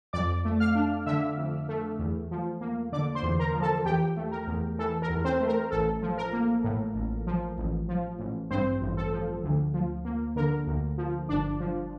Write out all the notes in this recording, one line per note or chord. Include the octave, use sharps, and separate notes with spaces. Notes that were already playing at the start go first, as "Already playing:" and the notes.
F2 D5 D6
A3
F5 F6
D4
D3 E5 E6
F2
A3
E2
F3
A#3
D3 D5 D6
C5 C6
E2
A#4 A#5
F3
A4 A5
E2 G4 G5
A3
A#4
E2
E3 A4
A#4
E2
C4 C5
A3
A#4
A1 A4
F3
A#4
A#3
A2
A1
F3
A1
F3
A1
G2 C4 C5
A1
A4
F3
D2
F3
A#3
D3 A#4
D2
F3
G1 D4 D5
F3